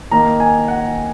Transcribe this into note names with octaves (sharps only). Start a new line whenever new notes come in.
D#3 A#3 D#4 A#5
G#5
F#5